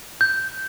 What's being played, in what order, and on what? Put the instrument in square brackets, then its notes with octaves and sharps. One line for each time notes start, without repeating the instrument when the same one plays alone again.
[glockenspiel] G6